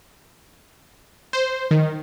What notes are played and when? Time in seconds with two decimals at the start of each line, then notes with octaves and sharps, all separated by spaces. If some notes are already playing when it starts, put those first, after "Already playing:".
1.33 C5
1.71 D#3